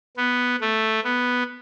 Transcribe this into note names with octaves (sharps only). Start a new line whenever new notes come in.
B3
A3
B3